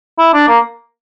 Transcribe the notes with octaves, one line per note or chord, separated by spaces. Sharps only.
E4
D4
A#3